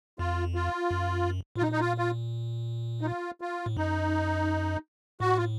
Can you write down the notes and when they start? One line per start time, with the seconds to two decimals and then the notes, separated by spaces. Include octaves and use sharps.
0.19 F2 F4
0.55 F4
0.91 F#2
1.56 A2 F4
1.62 A#2 D#4
1.72 D#4
1.80 F4
1.98 F4
3.01 D#4
3.06 F4
3.41 F4
3.66 A2
3.77 F#2 D#4
5.20 A2 F#4
5.37 F4